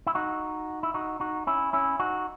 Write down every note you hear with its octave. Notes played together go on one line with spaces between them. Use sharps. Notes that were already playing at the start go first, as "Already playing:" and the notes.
E4
D#4 F#4
E4
D#4 F#4
D#4 F#4
C#4 E4
C#4 E4
D#4 F#4